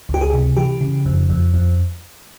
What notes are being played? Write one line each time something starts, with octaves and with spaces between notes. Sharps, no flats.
C#2 G4
G#4
C3
E3 G4
C#3
F2
F2
F2